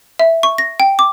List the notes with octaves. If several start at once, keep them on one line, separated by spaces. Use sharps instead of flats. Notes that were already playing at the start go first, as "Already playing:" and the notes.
E5
C#6
A#6
G5
D6